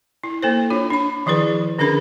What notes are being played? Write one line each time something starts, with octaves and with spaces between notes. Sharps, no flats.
E4
A#3 A4 C5
D4 F4 C#5
D4 B5
D#3 F3 E4 G#4 B4
D3 C#4 D4 G#4 A#4 B5